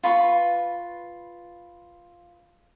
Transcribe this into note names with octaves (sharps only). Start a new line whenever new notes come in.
F4 B4 B5 C#6